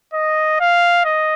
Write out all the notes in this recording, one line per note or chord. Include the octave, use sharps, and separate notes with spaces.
D#5
F5
D#5